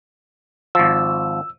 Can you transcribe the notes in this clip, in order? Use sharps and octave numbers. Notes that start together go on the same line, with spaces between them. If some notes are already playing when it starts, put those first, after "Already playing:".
G#1 F3 E6